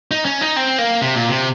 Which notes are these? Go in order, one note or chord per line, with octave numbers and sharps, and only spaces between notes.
D#4
C#4
D#4
C4
A#3
C3
A#2
C3